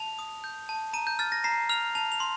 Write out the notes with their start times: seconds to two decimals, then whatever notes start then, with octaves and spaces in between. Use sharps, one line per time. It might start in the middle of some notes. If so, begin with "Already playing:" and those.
Already playing: A5 F7
0.19 D#6
0.44 G6
0.69 A5
0.93 A#5 D#7
1.07 G6
1.19 F6 A6
1.32 A#6
1.44 A#5 C7
1.69 F6 F7
1.95 A5 F7
2.12 F7
2.20 C6